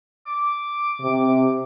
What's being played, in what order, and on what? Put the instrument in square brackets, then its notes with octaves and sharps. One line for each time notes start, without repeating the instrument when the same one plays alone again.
[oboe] D6
[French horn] C3